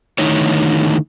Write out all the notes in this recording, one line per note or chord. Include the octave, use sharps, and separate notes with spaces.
D3 D#3 A3 D#4 E4 C#5